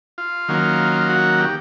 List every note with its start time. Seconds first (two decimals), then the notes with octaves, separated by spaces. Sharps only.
0.18 F4
0.48 D#3 F#3 A#3 C#4
1.09 F#4
1.39 G4